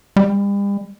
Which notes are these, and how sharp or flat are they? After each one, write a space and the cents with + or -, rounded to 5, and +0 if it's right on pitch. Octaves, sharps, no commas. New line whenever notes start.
G3 +40